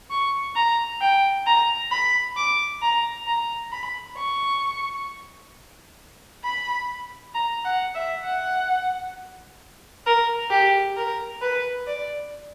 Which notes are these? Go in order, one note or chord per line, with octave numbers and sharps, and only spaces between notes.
C#6
A#5
G5
A#5
B5
D6
A#5
A#5
B5
C#6
B5
A#5
F#5
E5
F#5
A#4
G4
A#4
B4
D5